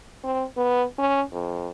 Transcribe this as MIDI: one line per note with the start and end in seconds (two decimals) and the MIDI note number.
0.24 0.44 60
0.57 0.84 59
0.98 1.22 61
1.32 1.69 41